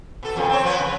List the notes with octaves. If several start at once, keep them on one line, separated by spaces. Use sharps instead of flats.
B2 A4
F2 A#2 C#3
C4 C#5
F3 B3 C4
C#3